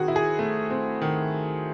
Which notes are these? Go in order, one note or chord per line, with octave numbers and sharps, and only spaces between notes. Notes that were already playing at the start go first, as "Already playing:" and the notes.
Already playing: D#3 C4 F#4 G#4
E4
G#4
A3
C4
D#3